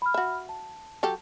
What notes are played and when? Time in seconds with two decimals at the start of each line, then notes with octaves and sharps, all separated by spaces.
0.02 B5 F6
0.14 F#4 E5
0.49 A5
1.03 F#3 G4 A4